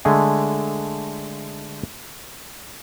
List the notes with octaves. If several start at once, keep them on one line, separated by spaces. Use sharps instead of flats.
D3 G#3 A3 G#4